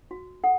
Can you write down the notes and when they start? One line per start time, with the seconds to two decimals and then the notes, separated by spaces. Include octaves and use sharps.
0.11 F#4
0.44 A4 F#5